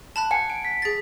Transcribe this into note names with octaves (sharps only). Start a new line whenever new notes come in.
A5 B5 F#6
F#5 G#5 C#7
D7
B6
G#4 A6